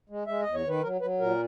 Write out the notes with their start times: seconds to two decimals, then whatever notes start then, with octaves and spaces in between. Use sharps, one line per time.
0.09 G#3
0.27 G#3 E5
0.41 D#5
0.46 E2
0.54 C#5
0.64 D#3 B4
0.83 F#3 A#4
1.01 F#3 B4
1.20 A#2 A#4